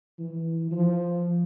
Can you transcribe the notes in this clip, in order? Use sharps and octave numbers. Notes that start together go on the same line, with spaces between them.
E3
F3